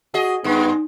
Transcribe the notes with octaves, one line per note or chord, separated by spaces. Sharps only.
F#4 G#4 D#5
F#2 G#3 B3 D#4